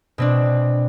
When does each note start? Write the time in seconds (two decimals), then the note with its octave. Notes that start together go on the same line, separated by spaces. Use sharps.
0.18 B2 C4 D4